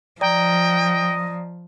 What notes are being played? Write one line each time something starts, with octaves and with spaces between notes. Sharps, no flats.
F3 D5 D#5 G5 A#5